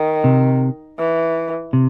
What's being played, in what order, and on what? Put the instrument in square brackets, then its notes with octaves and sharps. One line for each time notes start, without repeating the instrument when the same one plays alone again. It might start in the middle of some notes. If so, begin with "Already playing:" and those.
Already playing: [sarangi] D#3
[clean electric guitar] C3
[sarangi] E3
[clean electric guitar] C3